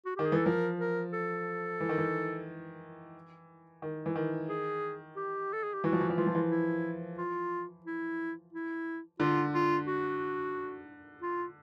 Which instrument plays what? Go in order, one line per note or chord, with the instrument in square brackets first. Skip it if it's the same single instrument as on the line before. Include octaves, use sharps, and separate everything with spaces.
[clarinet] F#4
[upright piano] D#3 [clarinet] G4
[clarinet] G#4
[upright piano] E3 [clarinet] A4
[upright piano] F3 [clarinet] A#4
[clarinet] A#4
A4
[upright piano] E3
D#3
E3
D#3
E3
D#3
[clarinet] G#4
G4
A4
G#4
G4
[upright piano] E3 [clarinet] F#4
[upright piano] F3
E3
F3
[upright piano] E3 [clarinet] F4
[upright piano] F3
E3
[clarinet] E4
F4
E4
E4
[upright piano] D3 [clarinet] F4
[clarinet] F4
F#4
F4